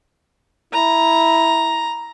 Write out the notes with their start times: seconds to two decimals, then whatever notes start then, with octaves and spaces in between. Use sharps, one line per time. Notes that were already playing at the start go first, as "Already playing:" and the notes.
0.73 E4 A#5